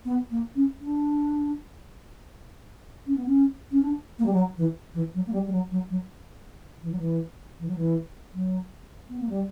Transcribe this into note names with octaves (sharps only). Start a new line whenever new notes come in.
B3
A#3
C#4
D4
C#4
B3
C#4
C#4
D4
A#3
G3
F#3
E3
E3
F#3
A#3
G3
G3
F#3
F#3
F#3
E3
F#3
E3
E3
F#3
E3
F#3
B3
A#3
G3